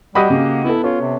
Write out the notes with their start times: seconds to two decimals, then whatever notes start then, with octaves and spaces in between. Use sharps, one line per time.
0.15 G3 F#4 G4 D#5 B5 D#6
0.30 C#3 A#3
0.65 B3 E4 A4
0.84 C#4 F4
1.01 C3